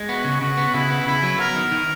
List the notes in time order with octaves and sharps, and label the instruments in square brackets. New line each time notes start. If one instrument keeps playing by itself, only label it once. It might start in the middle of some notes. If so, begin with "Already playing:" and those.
Already playing: [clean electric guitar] G#3
[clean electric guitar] B3 [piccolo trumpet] F#4
[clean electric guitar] C#3
[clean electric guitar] C#3 [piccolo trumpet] F#4
[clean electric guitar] B3
[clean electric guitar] C#3 [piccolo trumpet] E4
[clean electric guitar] B3
[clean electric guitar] C#3 [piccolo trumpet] E4
[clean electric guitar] F#3
[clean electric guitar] B3 [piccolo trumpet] A#4
[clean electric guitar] D#3
D#3